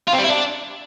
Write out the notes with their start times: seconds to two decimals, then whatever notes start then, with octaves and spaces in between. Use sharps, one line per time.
0.08 F4
0.13 C4
0.18 G3
0.24 E4
0.29 D4